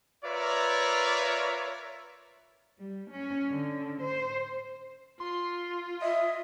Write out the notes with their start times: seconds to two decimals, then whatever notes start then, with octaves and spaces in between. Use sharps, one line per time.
0.25 F4 A#4 B4 C#5 D5 E5
2.79 G3
3.11 C#4
3.50 D3
4.01 C5
5.20 F4 C6
6.02 D#5 E5